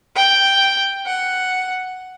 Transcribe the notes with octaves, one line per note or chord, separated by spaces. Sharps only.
G5
F#5